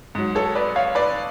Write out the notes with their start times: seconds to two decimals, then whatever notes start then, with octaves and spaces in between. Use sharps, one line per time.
0.15 G#2 F#3
0.35 A4 C#5
0.55 B4 D5
0.76 C#5 F5
0.95 B4 D5